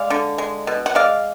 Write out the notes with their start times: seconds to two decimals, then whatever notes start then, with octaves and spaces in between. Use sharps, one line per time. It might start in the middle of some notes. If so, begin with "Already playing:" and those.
Already playing: G#3 D5 F5
0.10 D3
0.38 G#3
0.67 B2
0.86 F#5
0.95 G#3 D5 F5